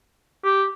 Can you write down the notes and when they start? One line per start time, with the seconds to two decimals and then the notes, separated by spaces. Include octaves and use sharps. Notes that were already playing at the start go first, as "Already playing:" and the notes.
0.44 G4